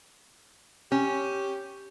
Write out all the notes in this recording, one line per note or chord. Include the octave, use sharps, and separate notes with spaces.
C#4 G4